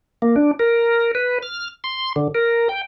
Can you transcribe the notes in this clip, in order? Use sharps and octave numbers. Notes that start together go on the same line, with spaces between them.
A#3
D4
A#4
B4
F6
C6
D3
A#4
G5